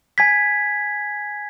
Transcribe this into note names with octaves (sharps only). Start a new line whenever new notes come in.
G#5 G#6 B6